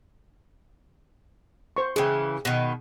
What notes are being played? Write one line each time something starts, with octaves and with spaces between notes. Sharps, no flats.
C5 C#6
C#3 E3 G#4 G5
B2 D#3